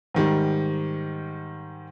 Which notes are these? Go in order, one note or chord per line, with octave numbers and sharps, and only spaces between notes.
G#2 D#3 G3